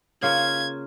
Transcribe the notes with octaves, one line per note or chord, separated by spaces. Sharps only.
C#3 A#3 F4 G#6